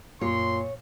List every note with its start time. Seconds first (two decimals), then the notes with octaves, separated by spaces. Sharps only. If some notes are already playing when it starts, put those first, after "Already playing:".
0.21 F#2 A#2 F4 C#5 C6